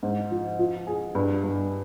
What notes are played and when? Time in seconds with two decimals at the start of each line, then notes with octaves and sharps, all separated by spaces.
0.03 G#2
0.31 F3
0.59 F3
0.87 G#4
1.15 G2
1.44 G2